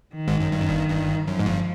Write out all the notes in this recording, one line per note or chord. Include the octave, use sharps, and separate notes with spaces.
D#3
G#1 G#2
F#2
G2
F#2
G1 G2
G1 G2
F#2 F3
G#2
G1 G2